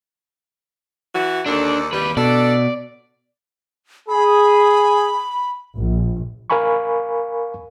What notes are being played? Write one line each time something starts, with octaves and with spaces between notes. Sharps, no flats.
E3 F#4
D#2 D3 D4 A4
D#2 G3 B4
B2 D4 A4 D5
G#4 B5
A#1
A#4 F5 G#5 B5 C#6